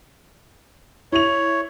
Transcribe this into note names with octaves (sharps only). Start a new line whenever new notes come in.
E4 C#5 F7